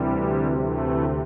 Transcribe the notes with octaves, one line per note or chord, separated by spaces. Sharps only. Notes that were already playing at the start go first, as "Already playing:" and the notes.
Already playing: D2 C3 E3 G3
E3 A3